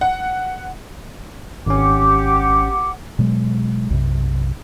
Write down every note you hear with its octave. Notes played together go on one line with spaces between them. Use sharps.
F#5
G#1 C#4 G4 F#5 D6
B2 F#3 G#3
B1 F#2 C3